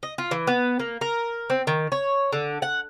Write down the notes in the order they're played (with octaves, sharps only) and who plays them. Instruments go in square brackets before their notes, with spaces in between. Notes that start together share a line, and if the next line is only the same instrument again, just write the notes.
[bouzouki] D#5
F4
E3
B3
A#3
A#4
C4
D#3
C#5
D3
F#5